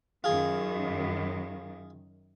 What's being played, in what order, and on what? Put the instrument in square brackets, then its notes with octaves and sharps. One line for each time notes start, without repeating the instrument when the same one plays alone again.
[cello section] F#2 D#3 [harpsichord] F4 G#4